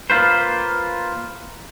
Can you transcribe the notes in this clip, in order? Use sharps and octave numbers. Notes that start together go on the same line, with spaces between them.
A#3 F4 B4 C5